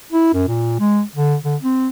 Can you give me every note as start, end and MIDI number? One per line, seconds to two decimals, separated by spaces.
0.12 0.29 64
0.33 0.46 42
0.48 0.75 46
0.80 1.02 56
1.15 1.36 50
1.44 1.56 50
1.62 1.89 60